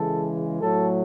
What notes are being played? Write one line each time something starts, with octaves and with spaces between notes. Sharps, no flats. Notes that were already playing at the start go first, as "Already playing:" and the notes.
Already playing: C#3 E3 G#3 A4
A2 F#3 A3 A4